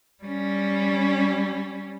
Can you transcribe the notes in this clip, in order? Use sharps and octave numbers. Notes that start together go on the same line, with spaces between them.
G3 C#4